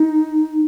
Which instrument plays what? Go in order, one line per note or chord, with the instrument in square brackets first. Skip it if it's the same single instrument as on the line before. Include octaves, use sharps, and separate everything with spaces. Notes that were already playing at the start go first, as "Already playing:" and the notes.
Already playing: [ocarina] D#4